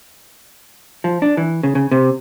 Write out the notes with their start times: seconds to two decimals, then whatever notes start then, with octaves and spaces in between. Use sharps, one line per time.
1.04 F3
1.22 D4
1.37 E3
1.63 C#3
1.75 C#3
1.91 C3